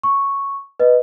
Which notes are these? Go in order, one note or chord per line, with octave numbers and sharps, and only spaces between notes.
C#6
B4 D#5